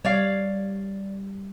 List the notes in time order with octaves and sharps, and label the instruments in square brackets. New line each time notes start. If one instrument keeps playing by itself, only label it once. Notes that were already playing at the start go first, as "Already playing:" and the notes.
[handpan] G3 [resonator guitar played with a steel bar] C#5 D5 F5